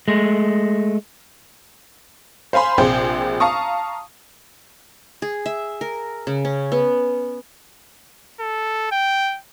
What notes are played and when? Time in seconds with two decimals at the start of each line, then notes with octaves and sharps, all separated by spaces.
0.08 G#3 A3
2.53 C5 F5 G#5 B5 C6
2.78 A#1 C3 G#4 C5 G5
3.40 F5 A5 A#5 C#6 D#6
5.22 G#4
5.46 E5
5.81 A#4
6.27 C#3
6.45 C#4
6.72 B3
8.40 A4
8.92 G5